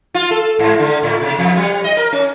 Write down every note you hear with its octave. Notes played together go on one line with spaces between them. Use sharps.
F4
A4
G#2
D3
A2
C3
F2
G3
D#5
A#4
C#4